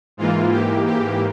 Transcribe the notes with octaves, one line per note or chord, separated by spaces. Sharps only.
G#2 E3 A#3 F4
G4
G4